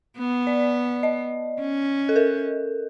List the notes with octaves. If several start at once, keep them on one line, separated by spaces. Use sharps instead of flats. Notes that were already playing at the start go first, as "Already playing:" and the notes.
B3
D5
D#5
C#4
A4
A#4